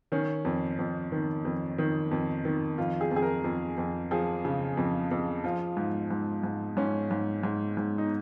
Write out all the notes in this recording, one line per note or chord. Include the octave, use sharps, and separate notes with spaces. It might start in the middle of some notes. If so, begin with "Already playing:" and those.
D#3 C#4
F2
F2
D#3
F2
D#3
F2
D#3
F2 F4
G#4
F2
G#4
A#4
F2
F2
F3 G#4
C#3
F2
F2
F3 F4
G#2
G#2
G#2
G#2 C#4
G#2
G#2
G#2
D#4